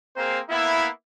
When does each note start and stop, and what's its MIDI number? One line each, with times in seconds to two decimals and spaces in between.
0.16 0.40 58
0.16 0.40 60
0.16 0.40 68
0.16 0.40 70
0.16 0.40 72
0.50 0.88 58
0.50 0.88 59
0.50 0.88 64